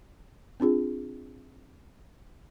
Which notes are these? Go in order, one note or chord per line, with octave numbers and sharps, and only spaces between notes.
C4 D4 F4 G#4